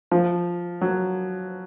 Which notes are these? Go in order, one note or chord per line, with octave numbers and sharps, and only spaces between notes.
F3
F#3